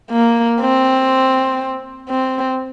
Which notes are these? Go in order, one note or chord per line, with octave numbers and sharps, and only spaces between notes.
A#3
C4
C4